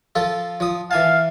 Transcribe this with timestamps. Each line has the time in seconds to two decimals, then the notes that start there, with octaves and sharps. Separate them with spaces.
0.15 F3 F4 A4
0.60 F3 D#6
0.91 E3 F5 G#5 A5